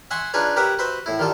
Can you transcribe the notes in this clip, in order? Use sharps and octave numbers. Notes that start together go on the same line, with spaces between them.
E5 F#5 G#5 C6 C#6
D4 D#4 F4 G#4 B4 C#5
G4 A#4 B4 C#5 E5 F#5
F#4 B4 C5 E5
A2 E4
D#3 G3 F4 A4